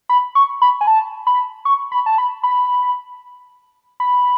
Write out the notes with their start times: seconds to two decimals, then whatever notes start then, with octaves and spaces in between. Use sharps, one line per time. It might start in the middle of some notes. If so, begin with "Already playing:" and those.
0.09 B5
0.35 C#6
0.62 B5
0.81 G#5
0.87 A5
1.27 B5
1.65 C#6
1.92 B5
2.06 A5
2.18 B5
2.43 B5
4.00 B5